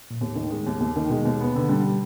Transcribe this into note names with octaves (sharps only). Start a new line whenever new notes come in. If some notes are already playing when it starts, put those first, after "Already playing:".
A#2
D#2 A2
D#3
G#3
D#2
D#2
D#3
B2 G#3
D#2
B3
D3
G3